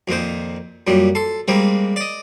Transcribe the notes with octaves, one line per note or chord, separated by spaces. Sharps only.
F2 A#2 D#3 C5
F#2 A#2 G3
A4 C6
G3 G#3 A#3 C4
D5 D#5